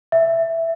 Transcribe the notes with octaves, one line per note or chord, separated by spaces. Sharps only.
E5